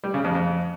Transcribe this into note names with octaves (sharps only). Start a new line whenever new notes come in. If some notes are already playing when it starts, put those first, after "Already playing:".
G3
C#3
F2
F2